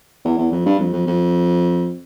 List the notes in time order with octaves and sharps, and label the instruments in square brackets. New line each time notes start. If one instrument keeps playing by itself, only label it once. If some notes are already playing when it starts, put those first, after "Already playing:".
[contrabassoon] E2
E2
F2
G2
F2
F2
F2